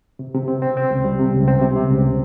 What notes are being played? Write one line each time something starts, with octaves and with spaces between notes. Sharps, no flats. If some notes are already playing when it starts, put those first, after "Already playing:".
C3
C3
C4
C4
C4
C#2
G3
C3
C#2
C4
C3
C3
C#2